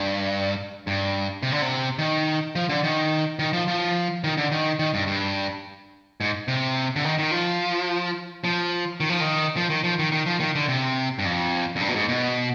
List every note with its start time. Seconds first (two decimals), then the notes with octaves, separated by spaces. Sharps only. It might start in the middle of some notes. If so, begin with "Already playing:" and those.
Already playing: G2
0.87 G2
1.43 C3
1.52 D3
1.62 C3
1.99 D#3
2.55 F3
2.69 D3
2.84 D#3
3.39 D#3
3.53 F3
3.68 F3
4.24 D#3
4.37 D3
4.52 D#3
4.79 D#3
4.94 G2
5.07 G2
6.20 G#2
6.48 C3
6.96 D3
7.05 D#3
7.19 D#3
7.31 F3
8.44 F3
9.00 D#3
9.10 F3
9.21 D#3
9.56 F3
9.70 D#3
9.84 F3
9.99 D#3
10.12 D#3
10.26 F3
10.40 D#3
10.55 D3
10.68 C3
11.19 G2
11.25 F2
11.76 F2
11.81 G2
11.89 B2
11.95 G#2
12.09 B2